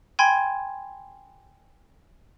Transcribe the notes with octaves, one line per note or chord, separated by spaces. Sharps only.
G5 G#5 B5 C6 G#6